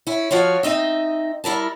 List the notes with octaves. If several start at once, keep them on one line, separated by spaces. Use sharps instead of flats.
C#4 E4
F3 F4 F#4 C#5
C4 D#4 D#5 E5
G3 E4 A#4 A5